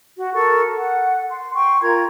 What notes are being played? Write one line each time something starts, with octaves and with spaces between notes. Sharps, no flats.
F#4
A4 A#4 C#6
F#5
C6
G5 C6 C#6
F4 A#4 A#5 G#6